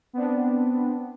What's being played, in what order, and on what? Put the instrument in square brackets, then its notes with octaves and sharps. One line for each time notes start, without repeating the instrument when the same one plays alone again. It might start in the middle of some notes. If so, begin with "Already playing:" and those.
[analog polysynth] B3 C4 D4